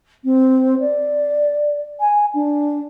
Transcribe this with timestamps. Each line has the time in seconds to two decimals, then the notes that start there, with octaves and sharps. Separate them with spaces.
0.24 C4
0.79 D5
1.99 G#5
2.34 D4